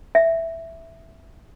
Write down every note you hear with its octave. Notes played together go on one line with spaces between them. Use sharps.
E5